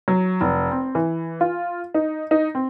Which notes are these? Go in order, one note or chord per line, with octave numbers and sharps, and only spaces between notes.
F#3
F1
C4
E3
F4
D#4
D#4
C4